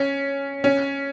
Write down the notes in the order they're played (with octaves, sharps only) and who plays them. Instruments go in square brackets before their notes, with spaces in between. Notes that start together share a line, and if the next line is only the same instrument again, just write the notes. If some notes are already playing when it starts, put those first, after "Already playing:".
Already playing: [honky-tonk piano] C#4
C#4